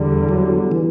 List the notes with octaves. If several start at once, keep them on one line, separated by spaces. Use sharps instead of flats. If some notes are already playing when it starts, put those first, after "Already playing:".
Already playing: E2 D3 G3
F#3
E3